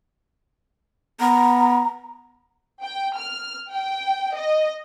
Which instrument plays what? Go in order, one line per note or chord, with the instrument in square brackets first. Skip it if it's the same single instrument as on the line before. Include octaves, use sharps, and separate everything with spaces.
[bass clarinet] B3 [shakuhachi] A#5
[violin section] G5
F6
G5
D#5